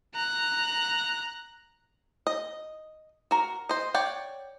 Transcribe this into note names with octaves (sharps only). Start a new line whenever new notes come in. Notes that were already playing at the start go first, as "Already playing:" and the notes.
A#5 F#6
D#5
F#4 A#4
C5 D#5
C#5 D5 F#5 G5